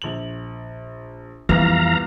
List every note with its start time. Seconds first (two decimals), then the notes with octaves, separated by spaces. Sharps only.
0.02 A#1 F#7
1.49 C2 F2 E3 F3 B3 F5 A#5